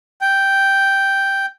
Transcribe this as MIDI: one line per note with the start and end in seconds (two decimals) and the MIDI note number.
0.21 1.46 79